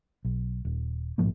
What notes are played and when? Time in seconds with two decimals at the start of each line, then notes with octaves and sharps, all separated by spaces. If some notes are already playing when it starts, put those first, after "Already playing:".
0.25 B1
0.65 D#1
1.18 A#1 G#2 F3 A#3